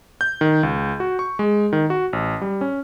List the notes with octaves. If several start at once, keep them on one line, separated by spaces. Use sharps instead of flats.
G6
D#3
C#2
F#4
C#6
G#3
D#3
F#4
A1
G3
C#4